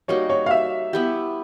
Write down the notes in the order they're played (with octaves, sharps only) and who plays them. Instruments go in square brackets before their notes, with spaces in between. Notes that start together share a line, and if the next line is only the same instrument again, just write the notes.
[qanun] G3 A#3 D#4 F#4 [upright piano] C#5
[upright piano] C#5
F5
E5
[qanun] B3 E4 G4